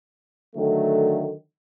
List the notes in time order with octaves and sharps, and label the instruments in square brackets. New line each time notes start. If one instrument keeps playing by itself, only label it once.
[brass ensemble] D3 D#3 F#3 A3